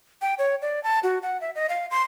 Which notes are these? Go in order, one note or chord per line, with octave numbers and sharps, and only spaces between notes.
G5
C#5
D5
A5
F#4
F#5
E5
D#5
F5
C6